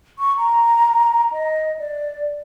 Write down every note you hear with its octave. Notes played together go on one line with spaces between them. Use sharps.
C#6
A#5
D#5
D5